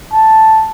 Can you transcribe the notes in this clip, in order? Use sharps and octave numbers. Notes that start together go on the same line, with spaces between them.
A5